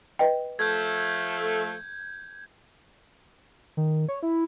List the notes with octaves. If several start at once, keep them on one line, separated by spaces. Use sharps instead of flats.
B4 D#5 G5
F3 A3 G6 G#6
D#3
C#5
E4